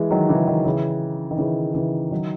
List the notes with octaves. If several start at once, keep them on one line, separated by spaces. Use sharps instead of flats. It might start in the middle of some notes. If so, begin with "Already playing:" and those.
Already playing: E3 G#3
D#3 F#3
C#3 E3
D#3
C#3 E3
D#3
C#3 E3
C#3 E3
D#3 F#3